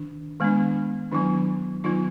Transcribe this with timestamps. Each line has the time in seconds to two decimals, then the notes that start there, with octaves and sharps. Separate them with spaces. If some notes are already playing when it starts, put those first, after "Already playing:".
Already playing: D#3 D4
0.40 D#3 G#3 B3 D4
1.11 D#3 F#3 B3 D4 E4
1.84 D#3 F#3 B3 D#4 F4